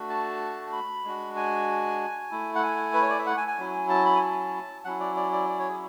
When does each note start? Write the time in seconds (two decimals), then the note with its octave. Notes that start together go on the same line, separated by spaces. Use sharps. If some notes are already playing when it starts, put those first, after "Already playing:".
Already playing: A3 D4 F#4
0.09 A5
0.72 B5
1.04 G#3 D4 F#4
1.36 G#5
2.31 A3 E4
2.55 F#5
2.63 G#5
2.94 B4
3.02 C#5
3.10 D5
3.19 E5
3.26 F#5
3.37 G#5
3.48 G#5
3.58 F#3 C#4 E4
3.89 A5
4.05 B5
4.15 G#5
4.21 A5
4.85 F#3 C#4 E4 F#5
5.00 D5
5.16 D5
5.32 D5
5.49 D5
5.59 C#5
5.69 G#4